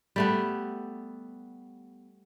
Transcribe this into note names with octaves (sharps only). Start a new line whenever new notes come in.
G3 A3 B3